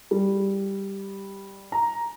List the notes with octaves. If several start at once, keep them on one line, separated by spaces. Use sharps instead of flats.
G3
A#5